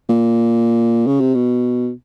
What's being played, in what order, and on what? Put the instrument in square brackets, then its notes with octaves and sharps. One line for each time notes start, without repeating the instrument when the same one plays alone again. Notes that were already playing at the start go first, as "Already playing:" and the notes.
[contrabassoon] A#2
C#3
C3
B2